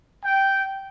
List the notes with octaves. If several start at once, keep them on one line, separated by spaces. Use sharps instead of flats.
G5